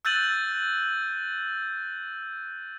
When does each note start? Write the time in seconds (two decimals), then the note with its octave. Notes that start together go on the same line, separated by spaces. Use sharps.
0.05 E6 F#6 G6 A6 D#7 F#7